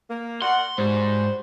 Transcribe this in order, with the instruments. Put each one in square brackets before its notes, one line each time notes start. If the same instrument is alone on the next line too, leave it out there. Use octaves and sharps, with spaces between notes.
[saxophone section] A#3
[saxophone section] A#4 D5 F#5 [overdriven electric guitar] C6
[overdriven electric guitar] G#2 [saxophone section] G3 F#4 C5